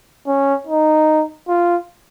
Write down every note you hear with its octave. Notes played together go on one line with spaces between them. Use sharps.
C#4
D#4
F4